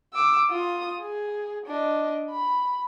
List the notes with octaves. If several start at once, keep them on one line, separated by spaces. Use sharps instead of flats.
D6 E6
F4 D#6
G#4
D4 D#5
B5